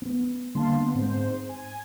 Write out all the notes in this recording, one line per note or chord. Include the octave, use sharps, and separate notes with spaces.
B3 C4
D3 G3 A#3 F5 A5 C6
B3
G#2 C4 C5
G#5